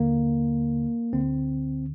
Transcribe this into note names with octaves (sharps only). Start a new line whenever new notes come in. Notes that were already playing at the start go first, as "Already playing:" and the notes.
Already playing: D#2 D3 A#3
D2 D3 C4